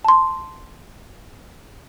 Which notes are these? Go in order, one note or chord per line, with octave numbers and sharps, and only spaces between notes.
A5 C6